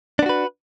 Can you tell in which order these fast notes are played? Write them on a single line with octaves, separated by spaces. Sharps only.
D4 B3 F#4 B4